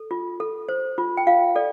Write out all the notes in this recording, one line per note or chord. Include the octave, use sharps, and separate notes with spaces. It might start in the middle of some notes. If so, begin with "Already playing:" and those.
Already playing: A4
F4
A4
C5
F4
G5
F4 F5
A4 D5